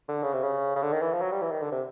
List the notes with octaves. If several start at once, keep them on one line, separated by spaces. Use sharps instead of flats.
D3
C#3
C3
C#3
C#3
D3
D#3
E3
F3
F#3
G3
E3
D#3
D3
C3